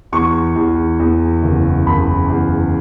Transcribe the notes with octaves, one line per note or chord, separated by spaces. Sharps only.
E2 C#6
E2
E2
F#1
F#1 B5
E2